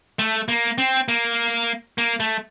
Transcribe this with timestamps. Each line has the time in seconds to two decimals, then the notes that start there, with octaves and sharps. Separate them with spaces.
0.19 A3
0.48 A#3
0.78 C4
1.08 A#3
1.98 A#3
2.20 A3